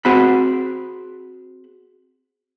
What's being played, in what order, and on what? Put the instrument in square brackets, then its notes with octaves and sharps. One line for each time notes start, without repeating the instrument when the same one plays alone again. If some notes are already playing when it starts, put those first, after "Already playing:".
[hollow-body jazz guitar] C4 F#4 G#4 B5